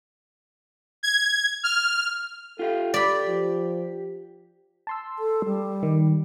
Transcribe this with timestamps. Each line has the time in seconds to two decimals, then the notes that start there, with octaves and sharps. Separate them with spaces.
1.03 G#6
1.63 F6
2.59 F4 G4 A4 F5
2.94 G4 D5 B5
3.28 F3
4.87 A5 C6 E6
5.19 A4
5.46 G3
5.83 D#3